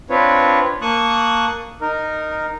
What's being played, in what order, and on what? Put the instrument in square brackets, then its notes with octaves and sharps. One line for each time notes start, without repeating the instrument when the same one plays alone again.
[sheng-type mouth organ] C4 D4 F4 B4 C#5
A#3 A5 C#6 D#6 F#6
D#4 A#4